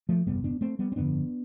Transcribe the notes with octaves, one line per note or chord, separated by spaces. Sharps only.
F3 A3
G1 F2 C3 G3 B3
B3 D4
A3 C4
G3 B3
C4
G1 F2 D3 B3 D4